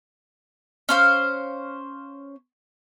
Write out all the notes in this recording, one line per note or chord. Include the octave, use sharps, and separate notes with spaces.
C#4 C5 F5